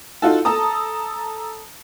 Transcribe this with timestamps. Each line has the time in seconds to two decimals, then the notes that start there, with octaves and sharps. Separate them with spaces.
0.22 D#4 F4 F#4 A4
0.45 A4 A5 A#5 D#6